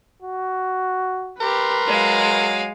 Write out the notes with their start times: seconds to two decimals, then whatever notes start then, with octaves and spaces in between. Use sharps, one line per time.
0.22 F#4
1.41 G4 A#4 B4 C6
1.87 F#3 G#3 F5